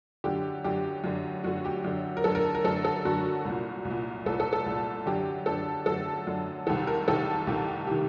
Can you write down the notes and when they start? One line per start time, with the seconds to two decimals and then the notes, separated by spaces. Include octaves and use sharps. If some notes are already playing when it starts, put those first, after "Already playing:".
0.24 F#2 D3 G4
0.64 F#2 D3 G4
1.04 F#2 D3
1.44 F#2 D3 F#4
1.65 G4
1.84 F#2 D3
2.17 A#4
2.24 F#2 D3 A4
2.35 A#4
2.55 A#4
2.64 F#2 D3 A4
2.85 A4
3.05 F#2 D3 F#4
3.45 C2 A#2
3.85 C2
3.90 A#2
4.26 C2 A#2 A4
4.40 A4
4.53 A4
4.66 C2 A#2
5.06 F#2 D3 G4
5.46 F#2 D3 A4
5.86 F#2 D3 A4
6.27 F#2 D3
6.67 C2 C3 D#3 A4
6.87 A#4
7.08 C2 C3 D#3 A4
7.47 C2 C3 D#3 G4
7.87 C3 D#3 G4